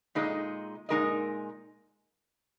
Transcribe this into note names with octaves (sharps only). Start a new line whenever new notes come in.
A#2 G#3 D#4 A#4 D#5
A#2 G#3 D#4 A#4 D#5